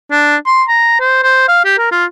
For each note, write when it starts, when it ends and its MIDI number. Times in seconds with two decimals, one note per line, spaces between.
0.12 0.36 62
0.46 0.63 84
0.68 0.97 82
1.00 1.23 72
1.23 1.45 72
1.48 1.61 77
1.65 1.78 67
1.78 1.89 70
1.92 2.05 65